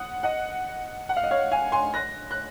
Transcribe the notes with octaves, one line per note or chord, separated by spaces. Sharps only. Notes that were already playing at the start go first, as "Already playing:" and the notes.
Already playing: F#5 D#6
D#5 F#5
F#5
F5
D#5
C#5 F5
F5 G#5
G#5 C6
F#6 A#6
F#6